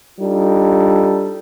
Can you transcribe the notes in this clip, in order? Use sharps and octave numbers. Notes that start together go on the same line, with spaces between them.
G3 D4 D#4 F4 A4